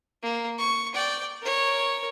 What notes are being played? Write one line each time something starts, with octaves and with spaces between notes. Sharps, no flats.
A#3
C#6
D5 G5
A#4 C#5